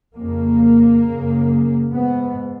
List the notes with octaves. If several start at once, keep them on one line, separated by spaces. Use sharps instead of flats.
F2 C#3 A#3
F#2 C#3
G#2 B3